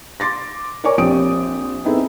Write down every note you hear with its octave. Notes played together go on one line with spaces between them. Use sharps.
C6 D6 A6 A#6
A#4 C#5 D5 G#5 C#6 D6
A#1 C4 G4 D#6 D7
B3 C4 D#4 E4 G#4 A4